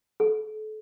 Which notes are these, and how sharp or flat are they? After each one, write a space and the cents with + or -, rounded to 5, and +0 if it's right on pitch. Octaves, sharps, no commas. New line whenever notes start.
A4 -35